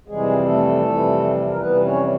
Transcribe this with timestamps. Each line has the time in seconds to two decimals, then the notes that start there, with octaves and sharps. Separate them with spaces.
0.08 F2 C3 E3 G3 G#3 G#4
0.45 A3 A4
0.83 F2 C3 E3 G3
1.49 A#4
1.58 F2 C3 E3 G3 B3 B4
1.84 C#4 C#5